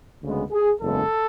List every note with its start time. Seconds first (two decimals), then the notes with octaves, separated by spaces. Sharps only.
0.22 D2 C#3 G#3 B3
0.51 G#4
0.81 F#1 E2 C#3 G#3 B3 A4